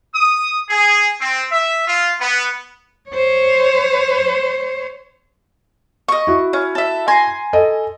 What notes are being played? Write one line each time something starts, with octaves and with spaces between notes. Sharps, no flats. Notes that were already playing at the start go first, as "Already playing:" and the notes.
D#6
G#4
C4
E5
F4
B3
C5 C#5
D#5 C#6
E4 F#4
C#4
A4 E5
G#5 A#5 C6
A4 D#5